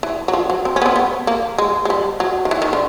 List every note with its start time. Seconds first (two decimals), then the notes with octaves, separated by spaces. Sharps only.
0.03 E3
0.28 F#3
0.33 F3
0.50 F#3
0.65 C4
0.76 C#4
0.82 B3
0.86 C4
0.96 B3
1.27 A#3
1.58 G#3
1.85 G#3
1.90 G3
2.20 F#3
2.45 D#3
2.51 E3
2.62 D#3
2.73 D3